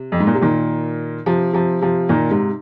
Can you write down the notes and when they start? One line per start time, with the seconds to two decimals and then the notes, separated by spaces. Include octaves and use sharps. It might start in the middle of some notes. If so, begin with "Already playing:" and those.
Already playing: C3
0.12 F2
0.20 G#2
0.27 A#2
0.35 C3
0.41 A#2 D#3
1.26 C3 F3
1.53 C3 F3
1.81 C3 F3
2.09 A#2 D#3
2.31 G#2 C3